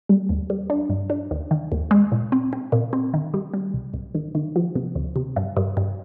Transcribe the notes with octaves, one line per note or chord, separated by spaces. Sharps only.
G3
D#2
G3
D4
G2
D4
D#2
D#3
D#2
G#3
A#2
C4
C4
A#2
C4
D#3
G3
G3
C2
C2
D#3
D#3
F3
C3
D2
C3
G2
G2
G2